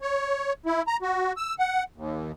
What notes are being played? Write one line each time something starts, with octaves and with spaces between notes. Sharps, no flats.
C#5
E4
A#5
F#4
E6
F#5
D#2